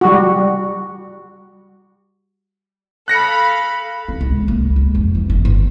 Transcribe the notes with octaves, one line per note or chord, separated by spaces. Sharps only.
G3 F#4
A4 F5 B5 F#6 A#6 C#7
C4
C#2
A#3
G#3
F2
E3
G1
D#3